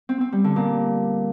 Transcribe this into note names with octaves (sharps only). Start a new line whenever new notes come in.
C4
C4
G3
D3
A#2